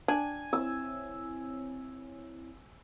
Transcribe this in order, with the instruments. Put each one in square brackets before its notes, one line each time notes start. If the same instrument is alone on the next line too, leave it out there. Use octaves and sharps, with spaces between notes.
[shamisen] D4 [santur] G#5
[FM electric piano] C4 E4 C#5 [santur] E6